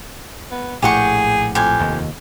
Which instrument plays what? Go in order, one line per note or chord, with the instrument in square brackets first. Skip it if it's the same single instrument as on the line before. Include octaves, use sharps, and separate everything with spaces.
[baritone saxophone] B3
[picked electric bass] A#1 A2 [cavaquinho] G4 F#5 C#6 [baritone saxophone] G#4
[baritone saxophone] F2 [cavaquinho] G4 G#5
[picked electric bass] F1 D#2